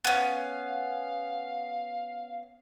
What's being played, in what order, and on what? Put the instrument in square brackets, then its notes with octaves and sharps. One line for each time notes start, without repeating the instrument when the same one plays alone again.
[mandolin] B3 C#4 [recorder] F5